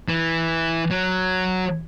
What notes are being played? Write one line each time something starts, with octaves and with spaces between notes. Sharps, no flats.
E3
F#3